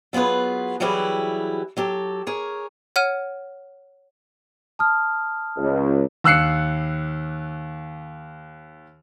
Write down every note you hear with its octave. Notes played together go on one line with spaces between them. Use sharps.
F#3 B3 F4 G#4 B4
E3 F#3 G3 E4 G4 G#4
F#3 G4 A4
G#4 A#4 C#5
C#5 F#5 F6 D#7
A5 D#6 F6
C#2
D#2 E6 F#6 C7 C#7